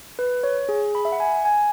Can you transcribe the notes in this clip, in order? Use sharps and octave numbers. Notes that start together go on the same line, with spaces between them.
B4
C#5
G#4
B5
E5
F#5
G#5
G#5